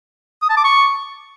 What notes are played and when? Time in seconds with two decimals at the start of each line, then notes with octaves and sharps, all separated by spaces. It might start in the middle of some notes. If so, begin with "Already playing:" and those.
0.42 D#6
0.50 A5
0.57 D6
0.64 C#6